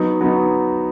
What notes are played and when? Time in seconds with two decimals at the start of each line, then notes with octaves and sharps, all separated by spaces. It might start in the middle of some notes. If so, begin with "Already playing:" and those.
Already playing: F#3 B3 D#4
0.21 F#3 B3 D#4